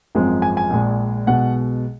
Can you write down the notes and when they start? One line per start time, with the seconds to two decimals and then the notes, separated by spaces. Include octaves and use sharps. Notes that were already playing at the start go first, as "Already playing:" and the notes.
0.15 G#1 F#2 F3 G#3
0.42 G#5
0.57 G#5
0.70 A#1 A#2 G#3
1.26 B1 B2 G#3 F#5